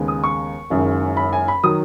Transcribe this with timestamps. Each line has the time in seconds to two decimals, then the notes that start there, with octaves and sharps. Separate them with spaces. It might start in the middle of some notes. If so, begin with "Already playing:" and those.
Already playing: D#2 C#3 G#3 B3
0.08 D#6
0.24 C#6
0.70 F#1 F#2 D#3 G#3
1.17 B5
1.33 G#5
1.48 B5
1.64 D#3 F#3 D#6